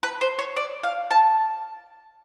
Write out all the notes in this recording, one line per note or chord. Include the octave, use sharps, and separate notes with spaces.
B4
C5
C#5
D5
F5
A5